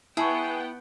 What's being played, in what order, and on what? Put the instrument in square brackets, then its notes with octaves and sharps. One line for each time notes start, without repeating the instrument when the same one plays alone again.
[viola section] B3 F#5 G5 [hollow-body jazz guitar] E4 [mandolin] G#4 [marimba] A5 C#6